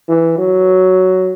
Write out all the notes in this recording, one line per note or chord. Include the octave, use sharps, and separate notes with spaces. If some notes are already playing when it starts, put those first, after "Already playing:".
E3
F#3